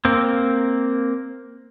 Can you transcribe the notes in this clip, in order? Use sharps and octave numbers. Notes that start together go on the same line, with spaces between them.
A#3 C4